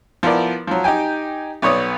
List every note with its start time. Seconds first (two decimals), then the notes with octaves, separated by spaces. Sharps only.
0.23 F3 B3 E4 A#4 D5
0.67 F3 F#3
0.84 D#4 G4 G5 G#5
1.62 B1 B3 C#5 D5 D#6